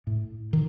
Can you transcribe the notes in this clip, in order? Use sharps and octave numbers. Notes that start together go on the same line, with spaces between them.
A2
D#3